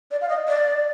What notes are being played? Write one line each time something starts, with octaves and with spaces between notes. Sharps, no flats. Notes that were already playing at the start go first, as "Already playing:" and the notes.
D5
F5
D#5
D5